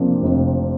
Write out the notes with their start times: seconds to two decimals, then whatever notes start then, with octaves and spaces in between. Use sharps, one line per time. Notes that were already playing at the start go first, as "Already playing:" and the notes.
Already playing: F1 F2 F3 A#3 D4
0.22 F1